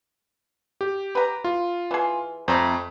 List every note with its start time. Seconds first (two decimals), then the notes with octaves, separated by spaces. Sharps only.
0.81 G4
1.15 B4 A#5
1.44 F4
1.91 E3 G#4
2.48 F2 A3 C5 A#5